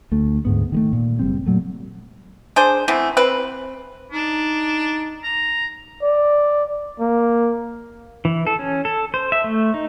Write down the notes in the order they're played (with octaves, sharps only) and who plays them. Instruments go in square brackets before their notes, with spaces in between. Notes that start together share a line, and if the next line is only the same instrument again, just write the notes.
[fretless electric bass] D2 A3
D2 G#2 B3
D#3 G#3 A3
A#2
F#1 G3 C4
A#2 F#3 A3
[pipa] D4 G#4 C5
E3 A3 B3 C4
C4 B4
[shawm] D4 [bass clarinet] D#4
[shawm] A#5
[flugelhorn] D5
A#3
[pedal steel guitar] E3
A4
C#4
A4
C5
E5
A3
D#4